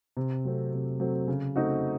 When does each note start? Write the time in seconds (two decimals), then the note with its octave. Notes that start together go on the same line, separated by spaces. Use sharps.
0.17 C3
0.45 F#3 A3 C4
0.73 C3
1.00 F#3 A3 C4
1.28 C#3
1.56 A3 C4 D#4 F#4